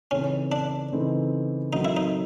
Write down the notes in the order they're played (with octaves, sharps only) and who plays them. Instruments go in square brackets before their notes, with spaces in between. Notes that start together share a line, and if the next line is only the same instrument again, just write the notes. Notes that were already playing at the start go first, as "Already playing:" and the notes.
[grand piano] C#3 E3 A3 C4 D#4 [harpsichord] C#4
[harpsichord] D4
[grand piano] C#3 E3 A3 C4 D#4
[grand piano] D#3 F#3 A3 C4 [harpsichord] D#4
[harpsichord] E4
D#4